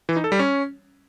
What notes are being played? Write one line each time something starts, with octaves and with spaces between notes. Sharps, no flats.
E3
D#4
A4
G3
C#4